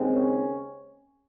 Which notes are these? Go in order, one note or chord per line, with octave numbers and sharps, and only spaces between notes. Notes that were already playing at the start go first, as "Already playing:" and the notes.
Already playing: D#2 C#3 G#3 C4
C#4